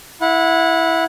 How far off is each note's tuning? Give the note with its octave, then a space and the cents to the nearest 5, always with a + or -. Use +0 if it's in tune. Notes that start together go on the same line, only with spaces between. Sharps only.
E4 +0 F#5 -25